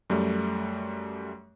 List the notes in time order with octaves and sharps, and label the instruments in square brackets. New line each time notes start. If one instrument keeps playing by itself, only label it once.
[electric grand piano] F#2 G3 A3